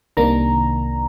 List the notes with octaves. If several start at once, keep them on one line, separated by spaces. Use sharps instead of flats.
C2 C3 D#3 A#3 D4 A#5